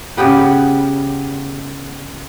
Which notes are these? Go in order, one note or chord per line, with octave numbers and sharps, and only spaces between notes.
C#3 B3 G4 B4